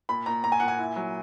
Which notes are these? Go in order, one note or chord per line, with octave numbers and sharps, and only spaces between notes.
A#2 B5
A#2 A#5
A#2 A#5
G#5
A#2 F#5
G#5
E4
F#3